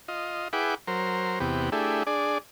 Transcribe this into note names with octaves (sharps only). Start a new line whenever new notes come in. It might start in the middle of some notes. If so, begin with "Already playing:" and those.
F4 D#5
E4 G#4 B4 F#5 G5 D6
F#3 A#4 C5
E2 C3 B3 G4
A3 D4 E4 G4 G#4
D4 G#4 D5